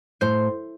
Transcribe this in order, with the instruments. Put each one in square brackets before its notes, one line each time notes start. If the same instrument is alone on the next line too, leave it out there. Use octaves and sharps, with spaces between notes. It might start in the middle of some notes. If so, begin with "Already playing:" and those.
[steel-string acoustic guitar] A2 [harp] C5